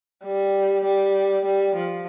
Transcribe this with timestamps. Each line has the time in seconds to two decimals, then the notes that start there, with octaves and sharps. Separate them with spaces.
0.24 G3
0.84 G3
1.45 G3
1.75 F3